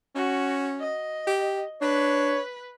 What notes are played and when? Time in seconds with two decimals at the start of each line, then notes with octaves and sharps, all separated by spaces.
0.15 C#4 F#4
0.80 D#5
1.27 G4
1.81 D4 B4 C#5